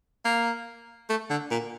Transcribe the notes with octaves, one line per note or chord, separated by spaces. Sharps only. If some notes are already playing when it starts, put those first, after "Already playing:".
A#3
A3
D3
A#2